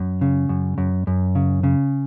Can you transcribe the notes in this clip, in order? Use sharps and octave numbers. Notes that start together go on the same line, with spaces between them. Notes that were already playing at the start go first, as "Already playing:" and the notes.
Already playing: F#2
C#3
F#2
F#2
F#2
C#3
C#3